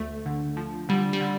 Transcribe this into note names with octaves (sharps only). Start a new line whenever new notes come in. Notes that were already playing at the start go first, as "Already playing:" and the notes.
Already playing: D2 A3
D3
F3
D3 G3
G3
D3